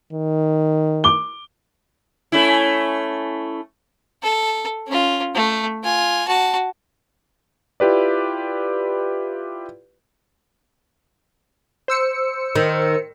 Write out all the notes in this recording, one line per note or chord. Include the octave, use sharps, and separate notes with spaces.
D#3
D6 G7
A3 C#4 E4
A4
C#4 F4
A3
F4 G#5
F#4 A5
E4 F4 G4 B4 D5
C5 E6 C#7
D#3